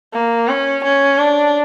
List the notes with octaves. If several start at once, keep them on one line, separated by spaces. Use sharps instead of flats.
A#3
C#4
C#4
D4